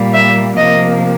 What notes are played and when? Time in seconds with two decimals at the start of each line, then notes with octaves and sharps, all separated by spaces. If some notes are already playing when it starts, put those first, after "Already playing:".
Already playing: A#2 G3 A#3
0.14 E5
0.56 C3 F3 A#3 D#5